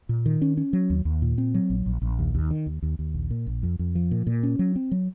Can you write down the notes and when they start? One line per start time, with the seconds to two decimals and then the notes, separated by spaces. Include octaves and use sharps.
0.09 A#2
0.26 D#3
0.42 C#4
0.57 C#4
0.73 F#3
0.90 D#2
1.05 D#2
1.22 A#2
1.38 C4
1.54 F#3
1.70 A#1
1.86 A#1
2.02 A#1
2.19 D#2
2.35 D#2
2.51 D#3
2.66 D#2
2.82 D#2
2.99 D#2
3.14 A#1
3.31 A#2
3.47 A#1
3.63 F2
3.79 F2
3.95 F3
4.11 A#2
4.27 A#2
4.43 C#4
4.59 F#3
4.76 C4
4.92 F#3